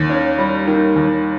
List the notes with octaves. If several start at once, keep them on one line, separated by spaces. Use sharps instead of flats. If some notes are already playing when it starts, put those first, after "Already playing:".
Already playing: D#2 D#3
C#4
G3
D#3
D#2